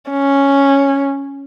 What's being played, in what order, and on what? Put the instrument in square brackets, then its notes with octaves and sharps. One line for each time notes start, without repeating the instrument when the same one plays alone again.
[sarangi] C#4